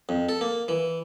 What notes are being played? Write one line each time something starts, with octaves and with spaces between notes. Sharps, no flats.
F2
A4
A#3
E3